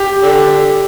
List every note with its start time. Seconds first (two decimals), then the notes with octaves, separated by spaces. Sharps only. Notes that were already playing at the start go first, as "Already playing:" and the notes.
Already playing: G4
0.23 D3